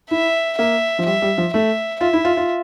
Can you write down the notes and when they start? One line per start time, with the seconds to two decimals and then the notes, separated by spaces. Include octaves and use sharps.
0.11 E4 E5
0.58 A#3 E5
0.99 F3
1.06 G3 E5
1.22 G3
1.38 F3
1.54 A3 E5
2.01 F4 E5
2.13 E4
2.25 F4
2.37 F4